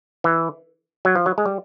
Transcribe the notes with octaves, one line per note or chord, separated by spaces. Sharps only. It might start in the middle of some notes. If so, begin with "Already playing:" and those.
E3
F#3
F3
F#3
G#3
G3